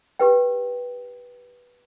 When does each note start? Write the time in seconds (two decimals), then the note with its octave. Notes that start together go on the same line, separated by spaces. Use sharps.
0.19 G4 B4 G5